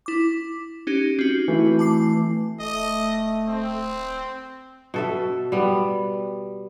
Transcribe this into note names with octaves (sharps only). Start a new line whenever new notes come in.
E4 D6
C#4 D#4 G4
C4 F#4
E3 A3
A5 D6 C7
D1 A3 D#5
C4
B2 A4 E5
G3 B3